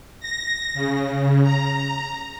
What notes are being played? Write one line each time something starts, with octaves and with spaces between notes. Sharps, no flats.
A#6
C#3
A#5